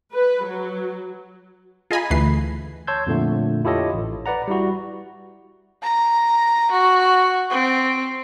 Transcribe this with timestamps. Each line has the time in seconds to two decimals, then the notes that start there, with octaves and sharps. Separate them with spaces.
0.12 B4
0.44 F#3
1.91 F4 G#4 D#5 G#5 A#5 B5
2.10 D2 E3 A3 B4 C7
2.87 C#5 A5 C6 E6 G6 G#6
3.07 F2 A#2 D3 A3
3.65 E4 F4 G4 A4 C#5 D#5
3.94 A1
4.26 B4 D5 F#5 A#5
4.48 G3 E4 F#4
5.83 A#5
6.71 F#4
7.50 C4